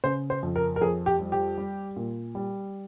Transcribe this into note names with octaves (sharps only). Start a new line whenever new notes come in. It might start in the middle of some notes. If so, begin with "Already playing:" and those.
C#3 C5
C5
F2
A#4
A#4
F2 G#4
G4
G3
G4
G3
A#2
G3